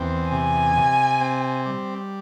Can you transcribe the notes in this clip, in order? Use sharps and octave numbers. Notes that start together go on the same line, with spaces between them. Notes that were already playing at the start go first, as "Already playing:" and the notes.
Already playing: E2 C4
C3 G#5
C3
C4
G3